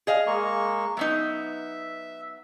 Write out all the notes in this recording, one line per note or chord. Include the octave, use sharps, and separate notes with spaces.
G#4 D#5 F5
G#3 A#3 C#6
F#3 B3 D#4 E5